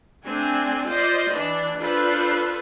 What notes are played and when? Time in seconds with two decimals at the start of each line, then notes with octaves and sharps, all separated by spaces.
0.24 A3 C4 D4 G#5
0.86 F4 C5 D5 D#5
1.31 E3 D4
1.79 D4 F4 A4 B4 C5